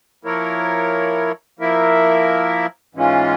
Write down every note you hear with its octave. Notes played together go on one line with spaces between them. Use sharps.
F3 A#3 E4 A#4 C#5
F3 A#3 E4 A#4 E5
G#2 E3 G#3 C#4 F4